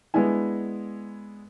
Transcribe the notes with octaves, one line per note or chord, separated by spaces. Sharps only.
G#3 B3 D4 E4 G#5